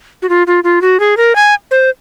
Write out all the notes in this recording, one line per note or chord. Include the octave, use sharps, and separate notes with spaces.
F#4
F4
F4
F4
F#4
G#4
A#4
G#5
C5